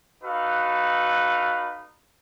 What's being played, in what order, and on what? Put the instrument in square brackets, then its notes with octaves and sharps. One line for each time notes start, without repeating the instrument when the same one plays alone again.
[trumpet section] D#4 F#4 A4 B4 F5